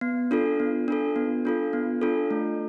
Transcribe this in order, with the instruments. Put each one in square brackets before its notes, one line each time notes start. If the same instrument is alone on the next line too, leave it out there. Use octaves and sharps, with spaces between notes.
[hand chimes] B3
D4 F4 A4
B3
D4 F4 A4
B3
D4 F4 A4
B3
D4 F4 A4
A3